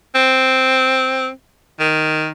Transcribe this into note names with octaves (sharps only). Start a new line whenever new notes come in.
C4
D#3